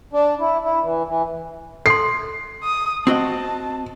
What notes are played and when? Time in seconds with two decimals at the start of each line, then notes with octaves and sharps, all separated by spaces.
0.13 D4
0.40 E4
0.65 E4
0.84 E3
1.08 E3
1.86 A4 C6 C7
2.64 D#6
3.07 C4 F#4 D#5 A5